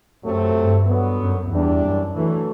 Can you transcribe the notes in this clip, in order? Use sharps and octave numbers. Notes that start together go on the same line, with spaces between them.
F#2 C3 F#3 A3 C4
G2
D3 F#3 B3
F#2
E2 E3 G3 D4
F#2
E3 F#3 A3 D4